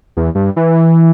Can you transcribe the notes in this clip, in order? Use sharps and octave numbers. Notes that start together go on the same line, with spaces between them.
E2
G2
E3